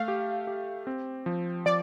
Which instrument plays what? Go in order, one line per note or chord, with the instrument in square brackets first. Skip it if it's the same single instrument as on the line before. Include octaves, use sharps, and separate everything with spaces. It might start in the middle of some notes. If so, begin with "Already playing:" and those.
Already playing: [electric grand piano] A3 [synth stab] F5
[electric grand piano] G4
G4
C4
F3
[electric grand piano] F3 [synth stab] D5